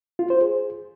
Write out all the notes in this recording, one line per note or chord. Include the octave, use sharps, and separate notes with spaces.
F4
C5
G#4